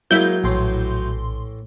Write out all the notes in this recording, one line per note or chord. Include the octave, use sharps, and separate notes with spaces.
F#3 G#3 A#3 E4 G6
A#1 A2 E3 A3 C6